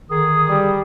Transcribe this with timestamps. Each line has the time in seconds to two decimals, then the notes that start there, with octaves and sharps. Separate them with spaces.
0.10 D3 D#3 G#4 D#6
0.49 G3